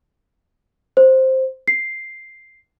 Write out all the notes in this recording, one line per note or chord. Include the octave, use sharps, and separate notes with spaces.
C5
C7